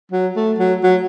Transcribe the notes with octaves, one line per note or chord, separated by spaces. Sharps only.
F#3
A3
F#3
F#3